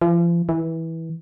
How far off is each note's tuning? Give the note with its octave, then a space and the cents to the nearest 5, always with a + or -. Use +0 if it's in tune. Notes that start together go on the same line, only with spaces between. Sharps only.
F3 -40
E3 -15